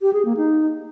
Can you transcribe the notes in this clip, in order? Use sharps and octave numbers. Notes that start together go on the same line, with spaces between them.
G4
G#4
A#3
D#4